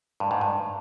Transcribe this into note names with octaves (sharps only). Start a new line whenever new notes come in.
G2
G#2
G2